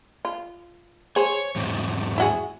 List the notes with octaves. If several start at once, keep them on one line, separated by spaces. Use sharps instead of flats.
F4
G#4 C5 C#5
E2 G#2 C4
E4 F#4 G#4